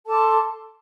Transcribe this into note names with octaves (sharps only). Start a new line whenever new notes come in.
A4 A5 C6 D6